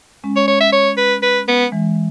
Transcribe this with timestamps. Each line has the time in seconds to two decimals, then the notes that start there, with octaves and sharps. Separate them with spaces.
0.24 G#3 C#4
0.36 C#5
0.48 C#5
0.61 E5
0.73 C#5
0.97 B4
1.23 B4
1.48 B3
1.72 E3 G#3